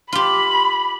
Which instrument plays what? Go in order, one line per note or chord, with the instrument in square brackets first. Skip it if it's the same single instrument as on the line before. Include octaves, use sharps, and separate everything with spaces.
[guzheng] F4 G4 [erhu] B5